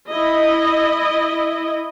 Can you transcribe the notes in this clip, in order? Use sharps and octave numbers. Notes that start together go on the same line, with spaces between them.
E4 D#5